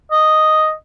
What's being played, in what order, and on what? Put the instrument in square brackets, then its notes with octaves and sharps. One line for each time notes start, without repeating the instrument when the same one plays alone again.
[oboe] D#5